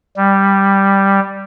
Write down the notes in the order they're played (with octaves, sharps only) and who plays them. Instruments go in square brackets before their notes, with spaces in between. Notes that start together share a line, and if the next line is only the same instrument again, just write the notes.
[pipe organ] G3